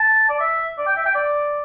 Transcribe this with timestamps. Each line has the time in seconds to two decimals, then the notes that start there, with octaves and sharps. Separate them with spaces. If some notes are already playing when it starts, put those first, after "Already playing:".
Already playing: A5
0.29 D5
0.40 E5
0.78 D5
0.87 G5
0.96 E5
1.06 G5
1.15 D5